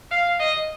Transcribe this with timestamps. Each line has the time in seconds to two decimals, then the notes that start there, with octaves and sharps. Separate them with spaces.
0.11 F5
0.40 D#5